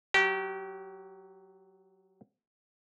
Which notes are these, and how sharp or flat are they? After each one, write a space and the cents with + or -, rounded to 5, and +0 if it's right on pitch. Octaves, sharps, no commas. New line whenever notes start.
F#3 +0 G4 -25